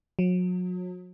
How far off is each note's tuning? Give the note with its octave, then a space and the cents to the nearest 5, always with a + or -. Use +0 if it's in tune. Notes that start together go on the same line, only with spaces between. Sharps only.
F#3 -35